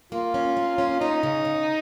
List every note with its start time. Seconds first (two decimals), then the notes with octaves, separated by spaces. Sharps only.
0.12 A#3 F4
0.34 C#4
0.57 A#3
0.78 C#4
1.01 C#4 D#4
1.23 C#3
1.45 C#3